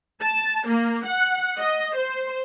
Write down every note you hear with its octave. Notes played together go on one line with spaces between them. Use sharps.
A5
A#3
F#5
D#5
C5